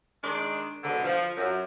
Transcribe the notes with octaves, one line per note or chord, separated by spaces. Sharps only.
D#3 G#3 D4
G#2 B2 D3
F3
F#2